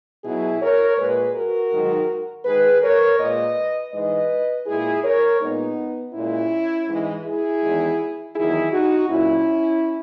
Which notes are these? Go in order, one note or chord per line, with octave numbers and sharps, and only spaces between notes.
B2 F#3 E4 G#4
A#4 C#5
A#2 G#3 G#4 B4
F#4 A#4
G#2 D#3 F#3
G#2 D#3 G#3 G#4 B4
A#4 C#5
A#2 G#3 B4 D#5
G#2 E3 G#3 B4 D#5
A#2 G#3 E4 G#4
A#4 C#5
A#2 G#3 B3 D#4
A#2 G#3 C#4 E4
G#2 E3 G#3
E4 G#4
E2 D#3 G#3
E2 D#3 F#3 E4 G#4
D#4 F#4
A#2 F#3 C#4 E4